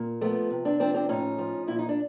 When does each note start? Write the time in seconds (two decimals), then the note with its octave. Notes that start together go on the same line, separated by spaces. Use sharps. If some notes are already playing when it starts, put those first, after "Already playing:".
Already playing: A#2
0.21 F3 A3 B3
0.50 C3
0.65 C4 D4
0.80 F3 C4 D4
0.94 C4 D4
1.09 A2 C#4 D#4
1.38 F3
1.67 A#2 E4
1.79 D#4
1.89 D4